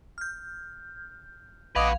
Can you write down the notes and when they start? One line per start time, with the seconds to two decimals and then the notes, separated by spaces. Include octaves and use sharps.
0.18 F6 G6
1.76 A#1 F#4 B4 D#5 F5 D6 G#6